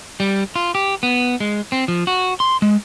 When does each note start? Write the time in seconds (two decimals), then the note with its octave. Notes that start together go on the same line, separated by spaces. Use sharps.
0.20 G3
0.56 F4
0.75 G4
1.03 B3
1.40 G#3
1.72 C4
1.88 F3
2.07 F#4
2.40 C6
2.62 G#3